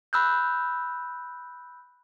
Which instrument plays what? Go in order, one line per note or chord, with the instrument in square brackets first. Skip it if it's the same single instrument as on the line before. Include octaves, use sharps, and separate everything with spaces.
[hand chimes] B5 E6 F#6 G6